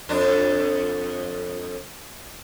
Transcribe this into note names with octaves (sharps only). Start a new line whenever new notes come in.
F2 D4